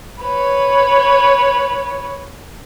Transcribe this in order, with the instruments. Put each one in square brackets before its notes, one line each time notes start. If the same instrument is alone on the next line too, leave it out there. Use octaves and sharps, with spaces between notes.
[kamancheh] B4 C#5